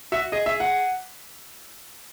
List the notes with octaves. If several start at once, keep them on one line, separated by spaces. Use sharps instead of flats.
F#4 E5
G#4 D#5
E5
F#5